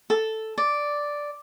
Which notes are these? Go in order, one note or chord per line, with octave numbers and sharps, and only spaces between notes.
A4
D5